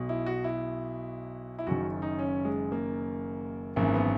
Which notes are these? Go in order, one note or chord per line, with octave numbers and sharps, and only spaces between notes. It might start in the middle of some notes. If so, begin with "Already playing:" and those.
Already playing: B1 B2
E4
F#4
E4
E4
F#1 F#2 D#3 F#4
D#4
C#4
G#3
A#3
G#1 F#2 E3 A#3
B3